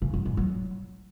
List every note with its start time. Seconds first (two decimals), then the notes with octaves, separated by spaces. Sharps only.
0.02 C#3
0.14 F#2
0.25 G#2
0.37 F#3